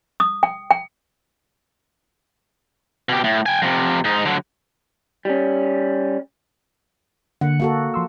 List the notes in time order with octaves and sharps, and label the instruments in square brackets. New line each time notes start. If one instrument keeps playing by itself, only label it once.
[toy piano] D#6
G5
G5
[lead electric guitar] B2 G4
A2
G5 G#5
F2 C3
G#2 D#4
D3 F#3
[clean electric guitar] G3 C#4
[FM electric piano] D3 A#3 [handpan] F#5
[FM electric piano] D3 [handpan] A#3 F#4 A4
[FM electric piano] F3 C6 E6